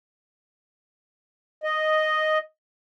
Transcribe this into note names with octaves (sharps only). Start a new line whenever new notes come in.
D#5